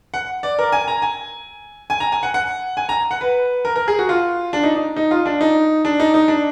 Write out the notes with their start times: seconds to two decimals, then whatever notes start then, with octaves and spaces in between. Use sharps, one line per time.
0.14 F#5
0.43 D5
0.59 A#4
0.72 G#5
0.88 A#5
1.02 G#5
1.90 G#5
2.00 A#5
2.12 G#5
2.23 F#5
2.34 F#5
2.77 G#5
2.89 A#5
3.11 F#5
3.21 B4
3.65 A#4
3.76 A#4
3.88 G#4
3.99 F#4
4.09 F4
4.53 D4
4.63 D#4
4.75 D#4
4.96 D#4
5.11 F4
5.26 D4
5.41 D#4
5.85 D4
6.00 D#4
6.14 D#4
6.28 D4